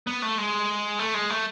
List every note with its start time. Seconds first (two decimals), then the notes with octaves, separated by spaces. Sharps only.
0.07 B3
0.22 A3
0.38 G#3
0.99 A3
1.14 G#3
1.30 A3